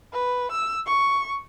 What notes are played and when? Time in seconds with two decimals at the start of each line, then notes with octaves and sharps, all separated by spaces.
0.13 B4
0.52 E6
0.86 C#6